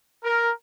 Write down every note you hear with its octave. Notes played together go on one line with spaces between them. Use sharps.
A#4